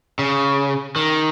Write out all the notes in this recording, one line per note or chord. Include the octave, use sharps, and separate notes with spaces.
C#3
D#3